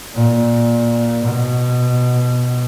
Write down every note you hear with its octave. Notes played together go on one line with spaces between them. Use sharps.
A#2
B2